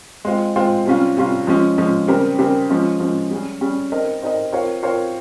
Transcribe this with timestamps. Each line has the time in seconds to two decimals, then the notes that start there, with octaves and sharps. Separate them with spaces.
0.25 G#3 C4 F4
0.56 G#3 C4 F4
0.86 C3 G3 C#4 F4
1.17 C3 G3 C#4 F4
1.47 F3 G#3 C#4
1.78 F3 G#3 C#4
2.08 C#3 G3 C4 G4 A#4
2.38 C#3 G3 C4 G4 A#4
2.70 F3 G#3 C#4
3.00 F3 G#3 C#4
3.31 G3 C#4 G#4
3.61 G3 C#4 G#4
3.92 C4 D#4 A#4 D#5
4.22 C4 D#4 A#4 D#5
4.52 C4 F4 A#4 C#5 F5
4.83 C4 F4 A#4 C#5 F5